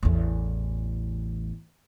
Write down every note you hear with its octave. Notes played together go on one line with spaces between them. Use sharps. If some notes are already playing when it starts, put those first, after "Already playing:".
A1 E2